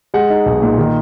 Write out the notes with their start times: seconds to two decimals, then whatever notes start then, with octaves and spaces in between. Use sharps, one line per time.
0.14 G#3 F#5
0.30 D#4
0.46 B1
0.62 A#2
0.78 D#3